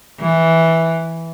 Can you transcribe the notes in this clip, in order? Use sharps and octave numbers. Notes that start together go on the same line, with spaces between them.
E3